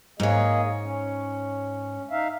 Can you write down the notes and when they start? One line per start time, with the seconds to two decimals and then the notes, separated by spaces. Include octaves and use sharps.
0.20 G#2 A#3 G#4 C#5 D#5
0.84 C#4
2.11 D#4 E5 F5